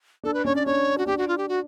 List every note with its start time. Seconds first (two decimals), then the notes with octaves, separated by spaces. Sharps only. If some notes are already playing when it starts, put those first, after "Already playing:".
0.23 D4 A4
0.34 B4
0.45 C#4 C#5
0.55 D5
0.66 D4 C#5
0.98 F#4
1.07 D4 G4
1.18 F#4
1.28 F4
1.38 G4
1.49 F#4